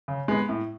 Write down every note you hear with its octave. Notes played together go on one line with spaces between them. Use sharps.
C#3
G#3 B3
A2